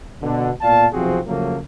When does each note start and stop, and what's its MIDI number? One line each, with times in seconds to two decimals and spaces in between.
0.22 0.50 47
0.22 0.50 50
0.61 0.86 46
0.61 0.86 59
0.61 0.86 74
0.61 0.86 77
0.61 0.86 81
0.93 1.20 35
0.93 1.20 48
0.93 1.20 53
0.93 1.20 60
0.93 1.20 66
0.93 1.20 68
1.27 1.58 49
1.27 1.58 53
1.27 1.58 54
1.27 1.58 57
1.27 1.58 58